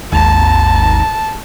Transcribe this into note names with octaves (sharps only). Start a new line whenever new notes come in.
G#1 D#2 A5 A#5